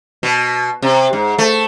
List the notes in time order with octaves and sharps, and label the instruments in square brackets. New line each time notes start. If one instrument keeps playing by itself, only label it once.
[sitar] B2
C3
G#2
A3